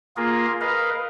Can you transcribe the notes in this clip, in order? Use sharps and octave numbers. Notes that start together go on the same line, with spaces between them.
A#3 F4 G#4 A#4
A#4 B4 D#5 F5